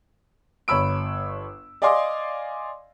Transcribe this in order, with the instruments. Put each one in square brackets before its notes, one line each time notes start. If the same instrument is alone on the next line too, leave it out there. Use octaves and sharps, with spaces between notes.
[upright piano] G1 C#5 B5 E6 D7
D5 D#5 F5 G#5 C6 D6